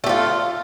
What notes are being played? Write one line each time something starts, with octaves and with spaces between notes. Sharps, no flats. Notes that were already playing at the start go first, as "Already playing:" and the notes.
A3 F4 G4